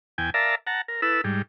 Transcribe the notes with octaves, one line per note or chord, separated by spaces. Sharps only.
E2 G5 G#5
A#4 D5 E5 F5 A5 A#5
F#5 A5 A#5
A#4
E4 A4 B4 E6
G#2 G3